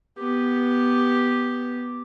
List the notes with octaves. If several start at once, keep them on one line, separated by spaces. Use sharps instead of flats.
B3 G4